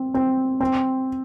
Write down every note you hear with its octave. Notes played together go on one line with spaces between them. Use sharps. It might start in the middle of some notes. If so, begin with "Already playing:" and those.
Already playing: C4
C4
C4